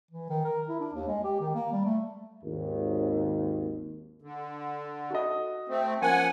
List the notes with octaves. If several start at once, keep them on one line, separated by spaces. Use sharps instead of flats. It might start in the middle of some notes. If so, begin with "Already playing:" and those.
E3
D#3
A#4
E4
D4
D#2
G#3
G4
D#3
A#3
G3
A3
G#1 D#2
D3
F#4 A4 D#5
A3 C4
F3 A#3 C#4 F#5 G#5